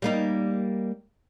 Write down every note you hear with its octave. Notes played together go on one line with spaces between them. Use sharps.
G3 A#3 D#4